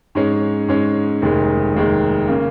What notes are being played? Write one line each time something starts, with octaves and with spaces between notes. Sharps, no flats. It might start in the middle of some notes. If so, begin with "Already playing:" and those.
G#2 G#3 C#4
G#2 G#3 C#4
F1 D#2 D#3 G#3
F1 D#2 D#3 G#3
C#3 A#3